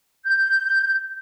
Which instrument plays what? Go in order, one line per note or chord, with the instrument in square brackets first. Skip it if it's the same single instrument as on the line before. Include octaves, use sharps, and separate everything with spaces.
[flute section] G6